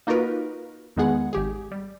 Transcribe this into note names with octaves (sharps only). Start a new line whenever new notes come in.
A#3 D#4 F4 F#4 A#4 B4
E2 D#3 G#3 B3 G#4 F#5
G#1 G4 G#4
G3